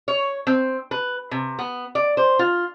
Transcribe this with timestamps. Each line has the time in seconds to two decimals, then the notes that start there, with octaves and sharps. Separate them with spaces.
0.08 C#5
0.47 C4
0.91 B4
1.31 C3
1.59 B3
1.95 D5
2.17 C5
2.39 F4